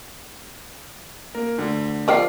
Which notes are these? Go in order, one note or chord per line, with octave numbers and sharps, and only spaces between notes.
A#3 A#4
D2 D3
F3 A#4 C5 D5 G5 D6 C7